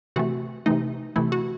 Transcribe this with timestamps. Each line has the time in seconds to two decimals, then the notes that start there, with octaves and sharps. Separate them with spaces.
0.16 C3 E3 A3 F#4
0.66 C3 E3 A3 D#4
1.16 C3 E3 A3 E4
1.32 F#4